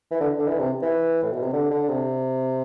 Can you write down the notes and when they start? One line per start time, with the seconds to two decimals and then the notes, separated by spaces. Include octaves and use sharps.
0.11 E3
0.20 D3
0.38 D3
0.47 E3
0.59 C3
0.82 E3
1.23 A2
1.33 B2
1.43 C3
1.53 D3
1.71 D3
1.88 C3